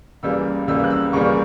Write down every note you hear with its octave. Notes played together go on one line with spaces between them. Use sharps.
C#2 C#3 E3 G3 A#3 E6
C#2 C#3 E3 G3 A#3 E6
F#6
E6
C#2 C#3 E3 G3 A#3 C#6